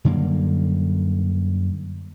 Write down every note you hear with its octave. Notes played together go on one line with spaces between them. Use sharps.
F#2 D3 G3 A#3